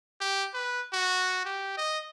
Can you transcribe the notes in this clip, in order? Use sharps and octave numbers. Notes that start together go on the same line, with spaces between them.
G4
B4
F#4
G4
D#5